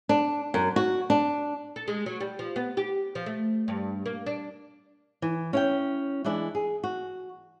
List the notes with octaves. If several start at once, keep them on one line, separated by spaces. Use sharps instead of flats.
D4
F#2
F#4
D4
A4
G#3
F#3
G3
F3
B3
G4
F3
A3
G2
A#3
D4
E3
C#4 E4 G5
E3 G#3 D4 E4
G#4
F#4